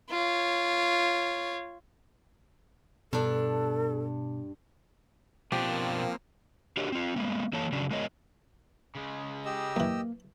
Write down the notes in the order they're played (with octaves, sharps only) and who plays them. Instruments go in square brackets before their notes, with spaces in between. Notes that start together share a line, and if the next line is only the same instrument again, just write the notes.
[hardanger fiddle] F4 C#5
[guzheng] G2 D4 [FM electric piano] B2 [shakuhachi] A4
[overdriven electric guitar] B2 D4 [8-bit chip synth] F3 [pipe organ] A#3 C4 [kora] G4
[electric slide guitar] D4 F#4 G4 A#4 C#5 D#5
C4 F4
G#3 A#3 B3
E3 A#3 A4 C#5 A5
C#3 F#3 C#4 D4
G#3 B3 A#4 C#5 D#5
[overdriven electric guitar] C#3 G#3
[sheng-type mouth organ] G4 D#5 E6
[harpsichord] F#2 E3 [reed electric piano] A#3